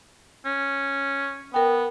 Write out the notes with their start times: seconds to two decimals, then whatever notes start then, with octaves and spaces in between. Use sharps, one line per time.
0.46 C#4
1.54 B3 A#4 G5